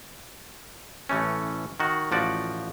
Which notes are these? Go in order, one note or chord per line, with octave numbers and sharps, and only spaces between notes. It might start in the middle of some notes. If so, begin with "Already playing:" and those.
A1 E3 A3 C#4
D#3 F#4
A1 F3 F#4 D5